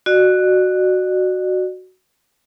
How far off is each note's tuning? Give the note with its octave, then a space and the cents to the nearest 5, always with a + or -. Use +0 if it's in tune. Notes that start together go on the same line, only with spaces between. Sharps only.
F#4 +0 D5 +45